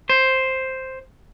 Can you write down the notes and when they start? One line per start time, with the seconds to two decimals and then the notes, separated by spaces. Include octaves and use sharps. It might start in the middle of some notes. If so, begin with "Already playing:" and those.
0.09 C5